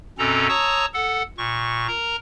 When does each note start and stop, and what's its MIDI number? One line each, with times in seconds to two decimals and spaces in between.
0.18 0.48 42
0.18 0.48 47
0.18 0.48 60
0.18 0.48 61
0.18 0.48 69
0.18 0.48 82
0.49 0.86 73
0.49 0.86 81
0.49 0.86 82
0.49 0.86 85
0.49 0.86 87
0.49 0.86 88
0.94 1.23 69
0.94 1.23 78
1.38 1.87 46
1.38 1.87 85
1.88 2.16 70
1.88 2.16 82